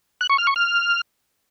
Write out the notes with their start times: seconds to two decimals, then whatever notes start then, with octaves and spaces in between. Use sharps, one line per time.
0.21 F#6
0.30 C#6
0.38 F6
0.47 C#6
0.56 F6